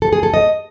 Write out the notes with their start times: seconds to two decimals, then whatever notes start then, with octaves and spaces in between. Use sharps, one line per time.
0.02 A4
0.13 G#4
0.23 A4
0.34 D#5